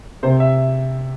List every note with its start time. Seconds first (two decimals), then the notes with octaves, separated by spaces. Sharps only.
0.23 C3 C5
0.40 E5